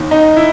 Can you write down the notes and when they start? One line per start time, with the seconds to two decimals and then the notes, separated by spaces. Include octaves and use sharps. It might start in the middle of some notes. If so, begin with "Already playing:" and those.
Already playing: D#2 D#3
0.11 D#4
0.36 E4